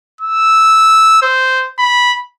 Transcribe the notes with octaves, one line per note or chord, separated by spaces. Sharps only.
E6
C5
B5